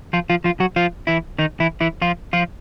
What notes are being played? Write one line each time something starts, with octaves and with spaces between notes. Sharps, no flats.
F3 F4
F3 F4
F3 F4
F#3 F#4
F3 F4
E3 E4
D#3 D#4
E3 E4
E3 E4
F3 F4
F3 F4